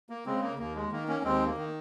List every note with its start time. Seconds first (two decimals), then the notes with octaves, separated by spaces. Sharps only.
0.10 A#3
0.26 C#3 G#3 C4
0.42 A#3
0.59 D#2 A#3
0.76 G#3
0.92 D#3 A#3
1.08 A#3 C#4
1.24 D#2 G#3 C4
1.46 A#3
1.57 D#3